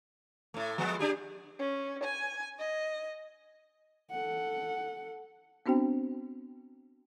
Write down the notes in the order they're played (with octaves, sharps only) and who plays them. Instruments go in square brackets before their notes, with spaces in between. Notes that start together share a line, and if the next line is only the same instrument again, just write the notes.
[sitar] A2 A3
F3 G#3 B3
D4 G4 G#4
[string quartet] C#4
G#5
D#5
[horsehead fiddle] A4 F#5
[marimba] B3 C4 D4 F#4 C5 G5